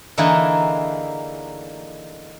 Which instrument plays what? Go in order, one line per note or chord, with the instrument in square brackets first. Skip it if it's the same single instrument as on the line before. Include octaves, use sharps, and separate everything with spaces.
[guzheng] D3 E3 A#3 D#4 G#4 G#5